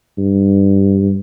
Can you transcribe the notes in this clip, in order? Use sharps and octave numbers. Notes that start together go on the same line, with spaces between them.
G2